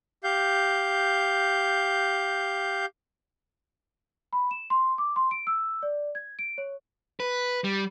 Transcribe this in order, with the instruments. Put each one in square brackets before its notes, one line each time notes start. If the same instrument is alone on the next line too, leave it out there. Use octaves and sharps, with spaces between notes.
[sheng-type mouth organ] G4 F5 G6
[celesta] B5
E7
C6
D6
C6
D7
E6
D5
G#6
D7
C#5
[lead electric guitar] B4
G3